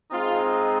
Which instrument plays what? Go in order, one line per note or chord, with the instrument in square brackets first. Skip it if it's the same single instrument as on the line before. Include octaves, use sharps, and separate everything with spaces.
[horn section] G#3 C4 D#4 F4